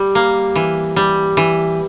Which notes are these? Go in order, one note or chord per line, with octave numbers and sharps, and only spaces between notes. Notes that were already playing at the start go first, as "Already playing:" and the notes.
Already playing: G3
A#3
E3
G3
E3